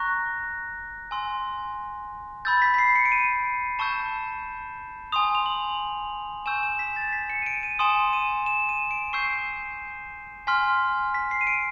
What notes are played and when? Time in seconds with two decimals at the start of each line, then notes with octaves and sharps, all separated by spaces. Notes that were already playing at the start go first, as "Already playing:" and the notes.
Already playing: A#5 C#6 F#6 A#6
1.11 G#5 C6 E6
2.45 B5 E6 G6 A6
2.62 B6
2.74 B6
2.78 C7
2.95 C#7
3.05 D7
3.12 D#7
3.79 A5 C#6 E6 G6 E7
5.12 G#5 C6 D#6 F7
5.35 F7
5.46 F#7
6.46 G#5 C#6 E6 G6 E7
6.63 E7
6.79 B6
6.96 A6
7.13 B6
7.30 C#7
7.42 D#7
7.46 D7
7.63 D#7
7.79 G#5 C6 D#6 E7
8.13 D#7
8.46 E7
8.69 D#7
8.91 D7
9.13 C#6 E6 G6 C7
10.47 G#5 C6 F6 B6
11.14 B6
11.31 C7
11.41 D#7
11.47 D7